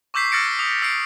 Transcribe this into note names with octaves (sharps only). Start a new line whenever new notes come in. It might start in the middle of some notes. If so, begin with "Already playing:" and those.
C#6 D6 E6 G6 B6 C7
E6 F6 A6 A#6 C#7 D7
D6 D#6 F7
E6 B6 C7 D7